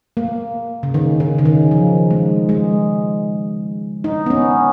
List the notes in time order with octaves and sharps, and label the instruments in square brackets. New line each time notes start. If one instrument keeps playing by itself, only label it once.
[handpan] A#3
C#3
D#3
D#3
C#3
D#3
F3
G#3
G#3
D#4
B3
C#4